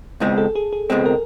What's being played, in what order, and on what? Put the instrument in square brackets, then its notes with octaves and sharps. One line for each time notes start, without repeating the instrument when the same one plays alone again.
[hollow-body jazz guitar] C#2 B2 G#3 C4 [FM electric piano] G#4
[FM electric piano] A4
G#4
G#4
[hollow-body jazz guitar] C#2 B2 G#3 C4 [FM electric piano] G#4
[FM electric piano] A#4